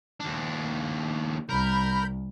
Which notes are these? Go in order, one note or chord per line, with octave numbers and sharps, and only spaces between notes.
D#2 D4
C2 A#4 B5 G6